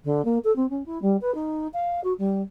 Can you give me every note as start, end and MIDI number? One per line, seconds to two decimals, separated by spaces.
0.04 0.24 50
0.24 0.38 58
0.44 0.54 69
0.55 0.68 60
0.69 0.82 61
0.85 1.00 64
1.02 1.16 55
1.21 1.33 71
1.34 1.67 63
1.73 2.00 77
2.03 2.13 66
2.18 2.41 55